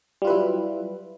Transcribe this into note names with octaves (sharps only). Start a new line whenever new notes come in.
F#3 G3 E4 F4 B4